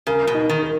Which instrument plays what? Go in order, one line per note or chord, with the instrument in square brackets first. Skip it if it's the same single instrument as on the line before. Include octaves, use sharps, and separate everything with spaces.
[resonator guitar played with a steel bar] C#3 [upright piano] A#4
[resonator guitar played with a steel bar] B2
[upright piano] D#4
[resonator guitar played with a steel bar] D#3
[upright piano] A#4